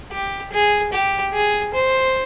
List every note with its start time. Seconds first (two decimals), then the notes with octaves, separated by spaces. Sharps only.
0.12 G4
0.52 G#4
0.92 G4
1.33 G#4
1.74 C5